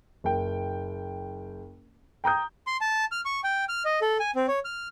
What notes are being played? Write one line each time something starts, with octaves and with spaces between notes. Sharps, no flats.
F#1 G5
G5 A#5 D#6 G6
C6
A5
F6
C#6
G5
F6
D#5
A4
G#5
C4
C#5
F6